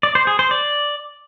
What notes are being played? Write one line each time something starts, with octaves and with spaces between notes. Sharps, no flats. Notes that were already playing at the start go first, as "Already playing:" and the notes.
D5
C5
G#4
C5
D5